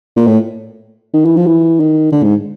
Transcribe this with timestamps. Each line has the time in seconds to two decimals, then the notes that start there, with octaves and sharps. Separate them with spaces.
0.16 A#2
0.27 A2
1.14 D#3
1.25 E3
1.36 F3
1.46 E3
1.80 D#3
2.12 D3
2.23 G#2